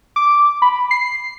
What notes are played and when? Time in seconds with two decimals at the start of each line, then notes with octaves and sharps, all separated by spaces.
0.16 D6
0.62 B5
0.91 C7